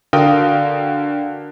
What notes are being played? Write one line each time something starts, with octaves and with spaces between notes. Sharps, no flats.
D3 F#4 A#4 F5 G5 D#6